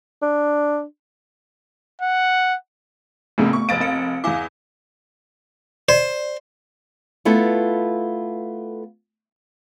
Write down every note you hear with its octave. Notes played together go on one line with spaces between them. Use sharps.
D4
F#5
A#1 A2 C#3 A3 B3 C4
C#6
F1 F5 A6 D7
C4 F5 C#7
E2 E4 F5 G#5 D6
C5 D5
A3 B3 E4 F4 A4 B4